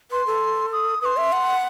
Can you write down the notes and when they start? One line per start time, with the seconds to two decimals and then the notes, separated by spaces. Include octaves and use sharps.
0.11 B4 C6
0.27 A4
0.73 D#6
1.02 B4 D#6
1.05 C6
1.17 E5
1.32 F#5